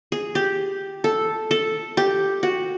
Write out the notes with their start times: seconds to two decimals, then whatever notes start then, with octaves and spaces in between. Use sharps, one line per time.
0.12 G#4
0.35 G4
1.04 A4
1.51 A4
1.97 G4
2.43 F#4